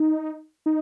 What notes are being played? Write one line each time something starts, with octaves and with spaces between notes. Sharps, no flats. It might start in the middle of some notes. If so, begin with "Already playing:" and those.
Already playing: D#4
D#4